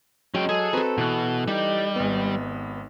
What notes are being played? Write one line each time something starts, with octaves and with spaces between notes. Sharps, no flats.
F#3 G#3 C#4 G5
G#4 A4 F#5
C4 F#4 A4 B4 A#5
B2 E3 F#6
G3 D#4 G4
G#1 B3